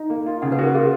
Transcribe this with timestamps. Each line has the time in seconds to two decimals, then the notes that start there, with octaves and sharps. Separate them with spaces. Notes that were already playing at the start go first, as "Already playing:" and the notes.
Already playing: D#4
0.10 A#3
0.26 F4
0.42 C#3 F#5
0.52 B4
0.59 F#4 A#4
0.75 F4 G#4